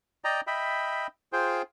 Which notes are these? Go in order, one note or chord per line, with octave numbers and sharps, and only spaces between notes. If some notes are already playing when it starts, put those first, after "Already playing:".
D5 D#5 G5 A#5
D#5 E5 G5 B5
F4 G#4 C5 G5